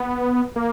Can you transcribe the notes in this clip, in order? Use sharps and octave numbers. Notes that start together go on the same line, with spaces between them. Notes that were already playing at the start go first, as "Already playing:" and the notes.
Already playing: B3
A#3